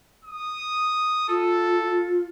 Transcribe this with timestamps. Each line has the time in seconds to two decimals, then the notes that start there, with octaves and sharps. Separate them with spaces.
0.24 D#6
1.28 F4 A4